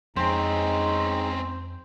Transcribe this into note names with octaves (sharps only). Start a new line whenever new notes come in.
F2 G#3 C4 C#4 D#4 C5 G5